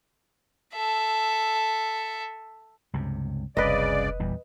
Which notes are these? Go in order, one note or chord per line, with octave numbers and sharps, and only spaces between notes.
A4 E5
C#2 G2 C3
F1 C2 F#2 C#3 B4 D5 D#5
E2 A#2 G3